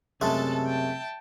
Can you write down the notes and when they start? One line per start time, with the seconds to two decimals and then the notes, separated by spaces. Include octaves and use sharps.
0.21 F#2 C3 G#3 A3 A4 E5 A5
0.66 G5 A5